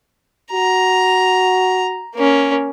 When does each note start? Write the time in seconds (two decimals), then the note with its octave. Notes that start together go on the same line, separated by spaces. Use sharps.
0.53 F#4 A#5
2.15 A#3 C#4